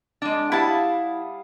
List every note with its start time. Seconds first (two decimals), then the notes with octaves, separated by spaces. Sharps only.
0.22 G#3 D4
0.52 G3 E4 F5 F#5 A5 D#6